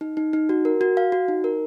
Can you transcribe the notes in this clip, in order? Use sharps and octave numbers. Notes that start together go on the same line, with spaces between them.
D#4
D#4
D#4
F#4
A#4
F#4
F5
F#4
D#4
A#4